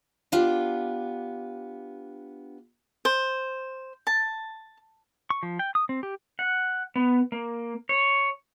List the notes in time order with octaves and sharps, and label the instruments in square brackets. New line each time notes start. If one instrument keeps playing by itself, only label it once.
[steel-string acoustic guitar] B3 D4 F4 G4
[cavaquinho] C5
A5
[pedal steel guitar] C#6
F3
G5
D#6
C4
G4
[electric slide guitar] F#5
B3
A#3
C#5